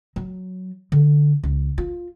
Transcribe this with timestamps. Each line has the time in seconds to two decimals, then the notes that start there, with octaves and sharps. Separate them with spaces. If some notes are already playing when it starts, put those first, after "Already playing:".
0.16 F#3
0.92 D3
1.43 C#2
1.78 F4